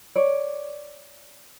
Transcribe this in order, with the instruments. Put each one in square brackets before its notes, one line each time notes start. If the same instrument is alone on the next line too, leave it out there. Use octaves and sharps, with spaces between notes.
[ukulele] C#5 D5